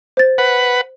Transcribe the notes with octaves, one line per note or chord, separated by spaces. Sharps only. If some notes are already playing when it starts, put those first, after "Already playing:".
C5 A6
B4 F#5